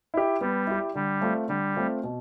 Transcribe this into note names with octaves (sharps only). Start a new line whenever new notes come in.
E4 G4
G3 B3
E4 G4
D3 G3
A3 C4 F4
D3 G3
A3 C4 F4
B2